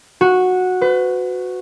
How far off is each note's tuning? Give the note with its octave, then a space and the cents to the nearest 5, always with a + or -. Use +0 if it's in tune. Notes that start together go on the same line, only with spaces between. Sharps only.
F#4 -10
B4 +35